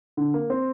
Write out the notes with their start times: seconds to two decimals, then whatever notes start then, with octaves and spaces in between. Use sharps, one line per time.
0.17 D3
0.34 A#3
0.50 C4